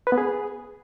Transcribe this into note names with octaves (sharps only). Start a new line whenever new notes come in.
B4
B3
G#4